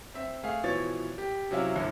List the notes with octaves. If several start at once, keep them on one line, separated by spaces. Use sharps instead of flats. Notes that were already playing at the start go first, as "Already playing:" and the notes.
C4 E5
A3 G#4 F5
B2 E3 F3 C#5 A6
G4
C3 F#3 C#4 E4 F4
G1 C2